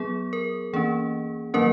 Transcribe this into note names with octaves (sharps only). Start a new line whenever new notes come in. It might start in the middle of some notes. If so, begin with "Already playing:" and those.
Already playing: F#3 B3 G#4
A#4
E3 A#3 C#4 G#4
D#3 F#3 A#3 C#4 A#4